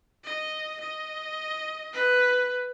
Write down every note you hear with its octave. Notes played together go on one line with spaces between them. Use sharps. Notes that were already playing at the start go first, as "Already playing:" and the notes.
D#5
D#5
B4